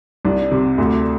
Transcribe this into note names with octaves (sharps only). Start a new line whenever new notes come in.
C2 D4
C3
D2